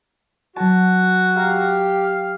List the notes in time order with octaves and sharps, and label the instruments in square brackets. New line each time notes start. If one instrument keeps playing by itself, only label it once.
[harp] F#3 A5 [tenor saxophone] F#4
[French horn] G4 [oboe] F5 [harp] A#5